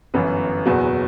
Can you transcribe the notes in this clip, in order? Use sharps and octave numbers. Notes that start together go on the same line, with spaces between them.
G1 F#2 E3 B3
F#1 E2 B2 F#3 B3